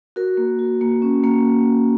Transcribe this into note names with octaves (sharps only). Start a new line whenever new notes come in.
F#4 A#4
A#3
F#4
A#3
C#4
A#3